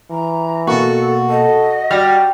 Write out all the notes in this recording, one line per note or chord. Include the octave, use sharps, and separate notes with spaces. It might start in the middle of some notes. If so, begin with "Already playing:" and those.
E3 A#5
B2 A#3 F#4 A4
A4 D#5
G3 F#4 F6 A#6